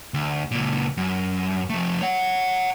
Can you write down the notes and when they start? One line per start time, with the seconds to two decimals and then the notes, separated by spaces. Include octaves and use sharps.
0.14 D2
0.51 C#2 A#2
0.97 F#2
1.70 F3 A3
2.01 C#5 F#5